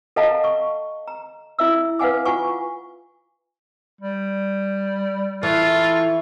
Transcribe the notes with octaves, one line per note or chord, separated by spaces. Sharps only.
A4 D#5 F5 F#5 A5 A#5
C#6
A#5
E4 E5 E6
B4 F5 F#5 G#5 D6
F4 F#5 G#5 C#6
G3
E3 F4 A4 C#6